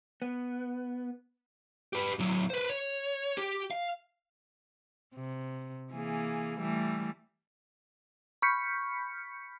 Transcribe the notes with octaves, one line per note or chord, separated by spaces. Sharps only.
B3
G4 B4
A2 F#3
B4 C5
C#5
G4
F5
C3
E3 A#3 G#4
E3 G3 A3
B5 C#6 F6 G6 B6 C#7